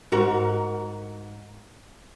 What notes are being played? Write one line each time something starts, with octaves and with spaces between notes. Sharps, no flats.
G#2 F#4 A#4